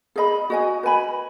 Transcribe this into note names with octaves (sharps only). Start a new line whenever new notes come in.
G#4 D#5 B5
F#4 D#5 G#5
B4 G#5 B5